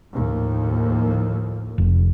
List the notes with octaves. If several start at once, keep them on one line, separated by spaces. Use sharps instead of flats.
D#2 A2 F3
F1